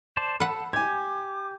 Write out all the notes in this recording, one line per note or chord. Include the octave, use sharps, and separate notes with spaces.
C5 D5 A5
A4 B4 F#5 B5
G4 G#5 D6 G#6